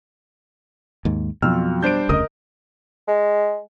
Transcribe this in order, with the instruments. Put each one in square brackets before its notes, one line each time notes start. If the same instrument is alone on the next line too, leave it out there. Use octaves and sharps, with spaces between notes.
[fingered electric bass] D#2 G#2
[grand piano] F2 F#3 F4 [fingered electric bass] B2 [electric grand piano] E6 F6
[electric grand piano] G3 D4 C5 [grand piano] G6 D7
[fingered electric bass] F1 D2 C#3 [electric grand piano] A#4 D#5 [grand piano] D#6
[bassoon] G#3